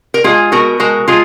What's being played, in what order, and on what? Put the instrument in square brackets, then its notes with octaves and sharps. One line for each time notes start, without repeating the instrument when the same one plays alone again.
[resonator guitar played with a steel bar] A#4
G#3 F4 G#4
B2 F#4 A#4
G#3 F#4 A#4
G#3 F4 G#4